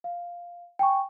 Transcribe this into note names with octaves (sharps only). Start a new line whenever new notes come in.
F5
G5 G#5 C#6